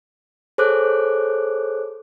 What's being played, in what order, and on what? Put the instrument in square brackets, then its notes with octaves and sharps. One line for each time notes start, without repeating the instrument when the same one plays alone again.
[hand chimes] G#4 A4 C5 C#5 D6 F#6